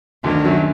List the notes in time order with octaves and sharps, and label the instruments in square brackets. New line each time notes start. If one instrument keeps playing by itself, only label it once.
[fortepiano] D2 D3 [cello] D#3
[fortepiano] F#2 F#3